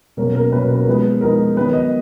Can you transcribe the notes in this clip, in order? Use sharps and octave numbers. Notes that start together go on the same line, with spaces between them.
B2 F#3 A#3 C#4 A#4
A#4
B2 F#3 A#3 C#4 B4
B4
A#4
F3 G#3 B3 D#4 B4
F3 G#3 B3 D#4 A#4
D#3 F#3 B3 B4
D#5